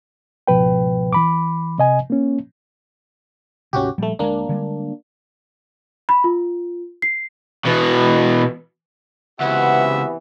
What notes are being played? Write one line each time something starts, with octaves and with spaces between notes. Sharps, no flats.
C#2 G#2 B2 F3 B4 G5
E3 B5 D6
C3 D#5 G#5
A#3 C#4
D2 G#2 C3 C#4 F#4 G4
A#1 G3 A3
D2 G#3 A#3 D4
D3 G3 G#3
B5
F4
C7
B2 E3
C#2 C3 E3 B3 F#4 E5 F#5